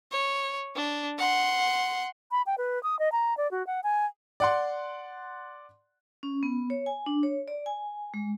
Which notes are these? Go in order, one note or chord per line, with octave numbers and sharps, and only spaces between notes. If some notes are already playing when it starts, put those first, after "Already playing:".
C#5
D4
F#5 C6
B5
G5
B4
D#6
D#5
A#5
D5
F#4
F#5
G#5
D5 F#5 C6
C#4
B3
C#5
G#5
D4
C#5
D5
G#5
G#3